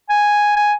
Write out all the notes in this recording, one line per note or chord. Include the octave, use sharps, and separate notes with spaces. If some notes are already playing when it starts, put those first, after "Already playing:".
G#5
G#5